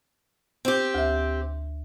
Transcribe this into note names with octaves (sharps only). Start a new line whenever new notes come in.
C4 G4
D2 E5